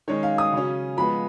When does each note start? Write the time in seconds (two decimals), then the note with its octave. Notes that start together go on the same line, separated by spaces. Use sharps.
0.08 D#3 G#3 C#4 C#5
0.23 F5
0.38 D#6
0.53 C#3 F#3 C#4
0.97 F3 G#3 B3 B5